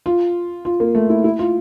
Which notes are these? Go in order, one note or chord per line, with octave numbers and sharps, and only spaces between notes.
F4
F4
A#3
A3
E4
E4
F4